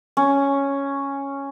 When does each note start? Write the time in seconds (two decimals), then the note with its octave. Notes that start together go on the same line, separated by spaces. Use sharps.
0.17 C#4